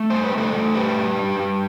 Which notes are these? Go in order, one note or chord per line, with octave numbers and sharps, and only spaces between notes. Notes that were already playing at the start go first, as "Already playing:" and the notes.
Already playing: A3
G2 C5
B4
A3
A4 C5
A3
G2 G4 B4
G2
G2
G2